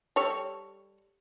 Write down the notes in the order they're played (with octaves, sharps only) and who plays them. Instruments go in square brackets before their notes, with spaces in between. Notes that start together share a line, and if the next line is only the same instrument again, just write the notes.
[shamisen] G3 A4 C#5